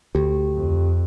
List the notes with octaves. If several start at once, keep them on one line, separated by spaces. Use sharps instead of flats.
D2 G4
F2